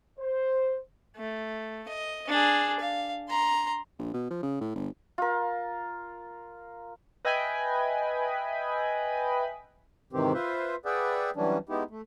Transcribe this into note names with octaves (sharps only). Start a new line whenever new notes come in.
C5
A3
D#5
D4 G#4
F5
A#5 C6
A#1
B2
F3
C#3
A2
G1
F4 A#4
B4 D#5 E5 G5 G#5 B5
G#2 C3 D#3 E3 C4 G4
F4 B4 C5 E5
G#4 B4 D5 E5 F#5 G5
E3 F#3 G3 C#4 D4
G#3 B3 D#4 E4 G4
A3